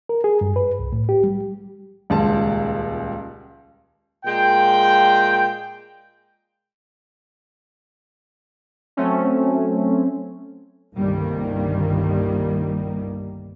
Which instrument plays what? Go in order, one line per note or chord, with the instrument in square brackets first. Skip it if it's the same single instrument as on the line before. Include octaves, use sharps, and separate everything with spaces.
[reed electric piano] A#4
G#4
G2
B4
C2
A2
G4
G3
[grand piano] D#1 C#2 G#3 A5
[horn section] A#2 G#3 G5
[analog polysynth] F#3 A3 C4 C#4
[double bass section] G1 C2 G2 D#3 G3 A#3